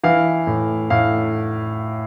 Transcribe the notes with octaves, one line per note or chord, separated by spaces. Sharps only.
E3 F5
A2
A2 F5